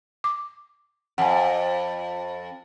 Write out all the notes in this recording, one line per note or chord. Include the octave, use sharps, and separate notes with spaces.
D6
F2 F#5 G#5